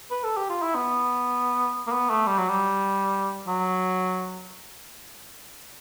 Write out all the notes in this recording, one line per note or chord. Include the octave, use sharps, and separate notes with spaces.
B4
A4
G4
F4
E4
B3
A#3
B3
A3
G3
F#3
G3
F#3